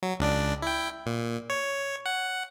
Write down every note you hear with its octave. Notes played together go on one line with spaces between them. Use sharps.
F#3
C#2 D4 D5
E4 G5
A#2
C#5
F#5